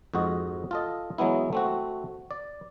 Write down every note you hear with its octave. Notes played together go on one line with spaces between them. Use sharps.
F2 G#2 F#4 D#5
F4 A4 D#5
E3 F#3 G#3 B3 E4
A3 C4 F#4
D5